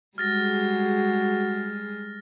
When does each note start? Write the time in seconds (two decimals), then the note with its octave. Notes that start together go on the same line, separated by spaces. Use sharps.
0.18 G3 G#3 F#4 G#4 F6 A6 A#6